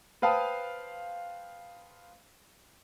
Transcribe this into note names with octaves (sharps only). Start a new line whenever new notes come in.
B4 C5 F5 G5 A5 D#6